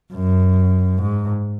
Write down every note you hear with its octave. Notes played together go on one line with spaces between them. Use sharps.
F#2
G#2